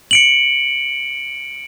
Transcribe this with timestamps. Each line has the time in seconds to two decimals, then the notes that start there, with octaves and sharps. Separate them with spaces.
0.11 C#7 D7 F#7